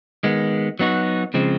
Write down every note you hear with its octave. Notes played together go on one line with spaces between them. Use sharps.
D#3 G#3 B3
F#3 B3 D#4 F#4
C#3 F3 G#3 C4